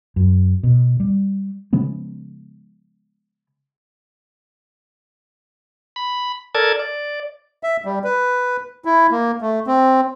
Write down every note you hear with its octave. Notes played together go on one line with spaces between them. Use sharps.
F#2
B2
G3
C#3 F3 G#3 B3
B5
A4 A#4 D5 A5 G#6
D5
E5
G3
B4
E4
A#3
A3
C4